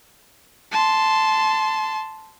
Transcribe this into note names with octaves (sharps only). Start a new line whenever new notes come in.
A5 C6